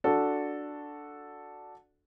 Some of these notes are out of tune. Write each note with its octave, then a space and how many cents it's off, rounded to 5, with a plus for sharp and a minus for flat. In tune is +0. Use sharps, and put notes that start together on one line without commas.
D4 +0 F#4 -10 A4 +0